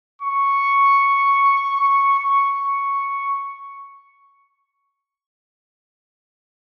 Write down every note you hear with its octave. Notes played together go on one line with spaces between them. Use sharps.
C#6
C#6
C#6